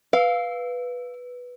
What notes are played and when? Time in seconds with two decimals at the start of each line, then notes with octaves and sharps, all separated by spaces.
0.13 B4 F5